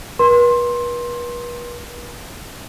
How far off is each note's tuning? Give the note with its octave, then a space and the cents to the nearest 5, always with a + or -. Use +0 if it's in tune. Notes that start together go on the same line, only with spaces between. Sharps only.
B4 -40 C6 +15